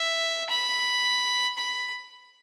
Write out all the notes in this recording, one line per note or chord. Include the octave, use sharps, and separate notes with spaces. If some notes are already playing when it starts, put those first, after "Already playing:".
Already playing: E5
B5
B5